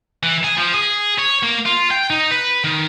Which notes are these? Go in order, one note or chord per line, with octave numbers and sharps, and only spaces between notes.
E3
G#4
F3
G#4
C#5
A#3
F4
G5
D#4
B4
D#3